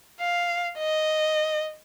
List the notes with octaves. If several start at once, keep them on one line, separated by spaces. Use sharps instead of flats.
F5
D#5